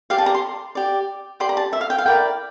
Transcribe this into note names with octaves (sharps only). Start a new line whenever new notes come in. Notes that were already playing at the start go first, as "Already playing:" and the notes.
G4 D5 F5
A5
A#5
C6
G4 D5
G4 D5 C6
A#5
A5
E5
F5
G5
F5
E4 A#4 D5 G5